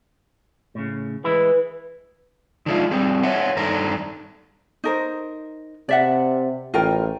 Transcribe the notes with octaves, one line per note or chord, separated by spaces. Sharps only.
A2 C#3
E3 G#3 E4 B4
D#3 F3 G#3 D4 E4 F4
G3 C4 G#4
C5 C#5 E5 F#5
G2 D#3 D4 A4 C5 A#5
D#4 A#4 C5
C3 D5 E5 F#5
A1 F4 A#4 G5